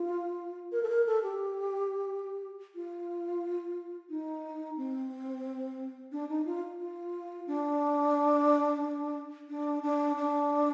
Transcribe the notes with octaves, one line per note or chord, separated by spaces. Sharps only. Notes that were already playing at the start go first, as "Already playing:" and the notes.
Already playing: F4
A#4
A4
A#4
A4
G4
F4
D#4
C4
D4
D#4
F4
F4
D4
D4
D4
D4